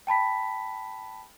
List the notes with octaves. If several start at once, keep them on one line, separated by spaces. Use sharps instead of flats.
G5 A5 B5 B6